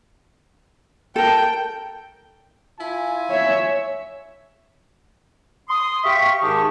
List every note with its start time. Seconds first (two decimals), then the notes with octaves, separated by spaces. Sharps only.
1.16 A4 A#4 G5
2.79 E4 F4 G#5
3.31 C#5 E5
5.69 C6 D#6
6.03 G4 E5 F5 C#6
6.42 G#2 D#3 G4 A5 C#6 D#6